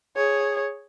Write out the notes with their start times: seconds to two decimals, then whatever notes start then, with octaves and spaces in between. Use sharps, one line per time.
0.16 G#4 C#5